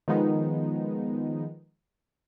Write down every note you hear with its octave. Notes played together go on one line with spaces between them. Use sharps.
D#3 F3 G#3 B3 D#4